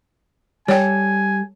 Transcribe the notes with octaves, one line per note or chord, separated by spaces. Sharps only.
G3 A4 C#5 D5 G5 G#5